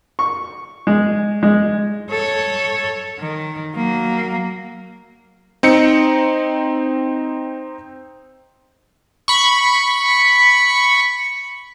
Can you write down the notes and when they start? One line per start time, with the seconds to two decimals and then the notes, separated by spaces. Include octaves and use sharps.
0.19 C#6
0.87 G#3
1.43 G#3
2.11 A4 C#5
3.20 D#3
3.75 F#3 A#3
5.63 C4 D#4 C#7
9.28 B5 C#6